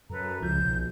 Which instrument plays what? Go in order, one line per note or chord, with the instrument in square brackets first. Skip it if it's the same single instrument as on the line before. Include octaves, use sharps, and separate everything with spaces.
[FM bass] F#2 [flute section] A4 B4 A#5
[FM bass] C#2 [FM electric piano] F3 [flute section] G6
[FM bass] B1